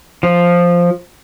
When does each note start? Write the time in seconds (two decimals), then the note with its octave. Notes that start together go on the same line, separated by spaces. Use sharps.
0.23 F3